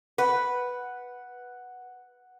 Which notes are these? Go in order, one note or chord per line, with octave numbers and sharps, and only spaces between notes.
B4 F#5